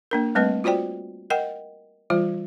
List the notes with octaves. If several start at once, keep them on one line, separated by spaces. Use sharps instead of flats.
A#3 D4 A#4
G3 A3 C4 B4 D#5
F4 F#4 C5 D5 G5
A#4 D#5 F#5 G5
E3 G3 F4 C5